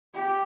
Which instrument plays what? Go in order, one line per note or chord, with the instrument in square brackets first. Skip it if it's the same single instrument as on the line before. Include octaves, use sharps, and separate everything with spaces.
[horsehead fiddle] G4